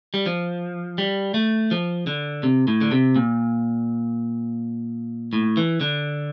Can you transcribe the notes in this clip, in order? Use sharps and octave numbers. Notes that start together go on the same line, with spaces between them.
G3
F3
G3
A3
F3
D3
C3
A2
D3
C3
A#2
A2
E3
D3